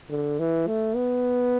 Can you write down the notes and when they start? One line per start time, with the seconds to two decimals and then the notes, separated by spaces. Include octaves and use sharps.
0.10 D3
0.39 E3
0.67 A3
0.96 B3